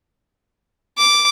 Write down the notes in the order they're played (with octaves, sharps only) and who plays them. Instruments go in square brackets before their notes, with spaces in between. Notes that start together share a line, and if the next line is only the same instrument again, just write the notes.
[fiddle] D6